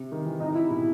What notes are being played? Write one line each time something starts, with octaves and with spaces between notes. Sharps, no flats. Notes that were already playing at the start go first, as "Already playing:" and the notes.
Already playing: C3
D#3
E3
C3 D#4
E4
B2